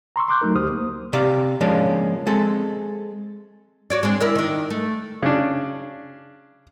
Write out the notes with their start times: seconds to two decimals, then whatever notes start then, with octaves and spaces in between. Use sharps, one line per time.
0.16 A#5 C6 C#6 E6
0.28 C6 D6 F#6 G6
0.41 F#3 A3 D#4 A#4
0.55 D2 G4 C5 D#6 F6
0.72 A#3
1.13 C3 D5 F5
1.61 F3 G#3 A#3 C#4 D4
2.27 G#3 C4 A4
3.90 F#4 C#5 D5
4.03 G#3 C4 D4
4.20 E4 A#4 D5
4.35 D#3 D4
4.70 A3
5.23 C#3 D4